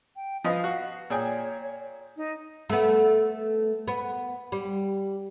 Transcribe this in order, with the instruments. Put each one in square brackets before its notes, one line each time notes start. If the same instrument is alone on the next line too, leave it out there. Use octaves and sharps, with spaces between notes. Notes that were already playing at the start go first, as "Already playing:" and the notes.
[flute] G5
[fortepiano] F3 B4 D#5 [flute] F5
[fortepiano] F#4
[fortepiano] A#2 G#4 G5 [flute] C#5
[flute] D#4
[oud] A3 B3
B3
G3